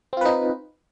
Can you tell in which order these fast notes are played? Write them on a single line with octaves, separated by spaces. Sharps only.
C4 F4 B4 D#4